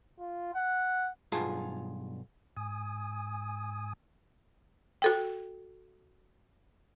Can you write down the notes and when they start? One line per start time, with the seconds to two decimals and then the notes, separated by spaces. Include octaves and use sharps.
0.19 F4
0.54 F#5
1.32 B1 G2 F4 G#4 A5
2.57 G#2 G#5 D#6
5.02 F#4 A4 G5